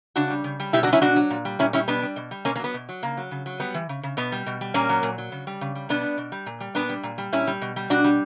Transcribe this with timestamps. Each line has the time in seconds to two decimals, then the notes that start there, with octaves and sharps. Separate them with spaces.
0.16 C#3 D4 F#4
0.30 G3
0.44 C#3
0.60 G3
0.73 B2 E4 G4
0.83 D4 F#4
0.87 F#3
0.93 C#4 E4
1.02 B2 D4 F#4
1.16 F#3
1.31 A#2
1.45 G3
1.59 A#2 C#4 E4
1.73 G3 C#4 E4
1.88 B2 B3 D4
2.02 G3
2.16 B2
2.31 G3
2.45 B2 A#3 C#4
2.55 A#3 C#4
2.59 F#3 B3
2.74 B2
2.89 F#3
3.03 C#3 A#3
3.17 F#3
3.31 C#3
3.46 F#3
3.60 G3 B3
3.74 E3
3.89 C#3
4.03 C#3
4.17 B2 B3
4.32 G3
4.46 B2
4.61 G3
4.74 A#2 A#3 C#4
4.89 F#3
5.03 A#2
5.18 F#3
5.32 C#3
5.47 G3
5.61 C#3
5.75 G3
5.89 B2 B3 D4
6.03 G3
6.17 B2
6.32 G3
6.46 A#2
6.60 G3
6.75 A#2 B3 D4
6.89 G3
7.03 A#2
7.18 G3
7.32 A#2 C#4 E4
7.47 G3
7.61 B2
7.76 G3
7.90 B2 D4 F#4
8.04 G3